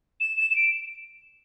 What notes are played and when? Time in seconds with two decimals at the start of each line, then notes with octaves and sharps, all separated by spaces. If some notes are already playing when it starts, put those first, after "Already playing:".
0.20 E7
0.37 E7
0.50 E7
0.56 D7